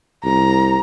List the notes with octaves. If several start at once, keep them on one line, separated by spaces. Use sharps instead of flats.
C2 A#5